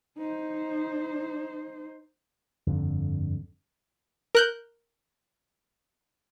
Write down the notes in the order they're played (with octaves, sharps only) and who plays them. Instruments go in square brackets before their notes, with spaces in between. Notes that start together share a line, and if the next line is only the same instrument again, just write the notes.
[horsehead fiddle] D#4 C5
[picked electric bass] G1 F2 D3
[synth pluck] A#4 F#6 G6